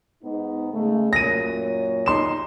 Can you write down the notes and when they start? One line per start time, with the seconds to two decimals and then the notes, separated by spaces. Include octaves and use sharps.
0.23 G#2 B3 D#4
0.73 C#3 G#3 A3
1.13 F#2 A#2 C#5 A#6 D#7
2.06 D#4 C6 E7